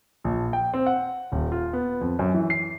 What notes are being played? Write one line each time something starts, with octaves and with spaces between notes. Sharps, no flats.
A#1
G5
C4
F#5
D#1
F4
B3
F2
F#2
E3
C7